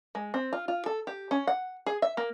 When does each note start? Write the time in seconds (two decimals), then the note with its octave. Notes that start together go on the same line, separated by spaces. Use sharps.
0.15 G#3
0.34 C4
0.53 F4
0.68 F4
0.86 A4
1.07 G4
1.31 C#4
1.47 F#5
1.86 G#4
2.02 E5
2.17 A#3